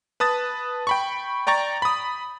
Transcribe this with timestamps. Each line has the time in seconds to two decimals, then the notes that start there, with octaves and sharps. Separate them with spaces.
0.20 B4 A5 D#6 A6
0.87 G5 B5 C#6
1.47 D5 G5 A#5 C#6 A6
1.82 B5 D#6